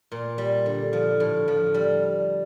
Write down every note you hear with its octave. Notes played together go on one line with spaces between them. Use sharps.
A#2
G3
D3
F3
A2
F3
G3